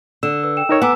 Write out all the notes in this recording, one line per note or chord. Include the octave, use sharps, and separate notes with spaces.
D3 E6 E7
B4 E6
G5 E7
D#4 A#4 C#5
B3 F#5 G#5 A#5 D6 E6